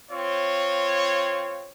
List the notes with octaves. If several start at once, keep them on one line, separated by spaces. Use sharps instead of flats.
C4 F4 C#5